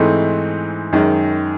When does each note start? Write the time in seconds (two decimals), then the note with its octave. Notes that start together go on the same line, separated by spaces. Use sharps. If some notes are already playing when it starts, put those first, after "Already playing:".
Already playing: G#2 E3 A3 C4 D#4
0.93 F#2 D#3 G#3